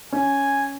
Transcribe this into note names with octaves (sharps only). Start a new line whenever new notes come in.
C#4 G#5